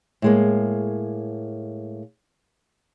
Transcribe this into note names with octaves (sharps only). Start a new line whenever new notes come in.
A2 G#3 A#3